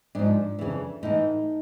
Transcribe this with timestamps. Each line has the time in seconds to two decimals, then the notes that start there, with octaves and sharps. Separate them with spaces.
0.15 G#2 F3 D4
0.59 F2 C#3 E3
1.03 A2 E3 D#4